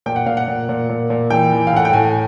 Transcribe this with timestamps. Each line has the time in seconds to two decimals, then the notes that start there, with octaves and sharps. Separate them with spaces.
0.06 A#2 G5
0.16 F#5
0.26 A#2 F5
0.37 F#5
0.48 A#2
0.69 A#2
0.89 A#2
1.10 A#2
1.30 E3 G5
1.53 E3
1.67 F5
1.73 A2 F#5
1.85 G5
1.93 A2 G#5